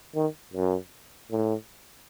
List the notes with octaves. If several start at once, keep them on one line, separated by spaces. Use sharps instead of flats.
D#3
F#2
A2